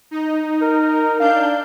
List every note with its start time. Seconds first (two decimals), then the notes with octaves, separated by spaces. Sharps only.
0.11 D#4
0.62 A#4
1.20 D4 F5 G6